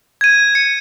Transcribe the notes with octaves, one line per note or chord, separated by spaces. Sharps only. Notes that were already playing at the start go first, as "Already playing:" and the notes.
G#6 D#7
C#7